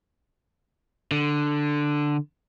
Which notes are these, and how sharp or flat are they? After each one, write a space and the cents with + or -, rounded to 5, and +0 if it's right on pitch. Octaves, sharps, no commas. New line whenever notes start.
D3 +5